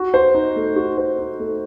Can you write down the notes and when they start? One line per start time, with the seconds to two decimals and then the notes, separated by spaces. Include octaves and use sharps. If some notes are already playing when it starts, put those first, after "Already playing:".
Already playing: F#4
0.14 C5
0.34 D#4
0.56 A3
0.76 F#4
0.98 C5
1.18 D#4
1.40 A3